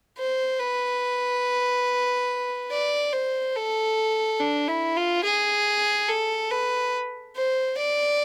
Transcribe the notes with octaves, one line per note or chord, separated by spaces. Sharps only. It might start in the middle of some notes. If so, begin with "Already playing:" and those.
C5
B4
D5
C5
A4
D4
E4
F4
G#4
A4
B4
C5
D5